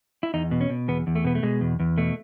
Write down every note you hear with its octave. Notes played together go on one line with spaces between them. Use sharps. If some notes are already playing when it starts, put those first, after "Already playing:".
E4
E2 D#4
B2
C#4
B2
E2 B3
E2
A3
B2 B3
A3
B2 G#3
E2
E2
B2 A3